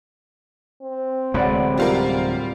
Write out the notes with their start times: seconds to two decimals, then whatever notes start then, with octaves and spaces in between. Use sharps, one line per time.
0.82 C4
1.34 D1 C3 G#3 B4 D5 F#5
1.78 G3 F4 A#4